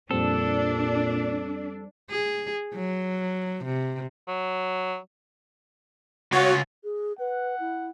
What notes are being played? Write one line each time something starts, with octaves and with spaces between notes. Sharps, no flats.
F2 A#2 G3 C4 D4 A4
G#4
F#3
C3
F#3
C#3 F4 F#4 C#5
G#4
B4 F#5
E4